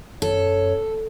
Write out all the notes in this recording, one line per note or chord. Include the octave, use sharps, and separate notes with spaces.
F#2 A4 C#5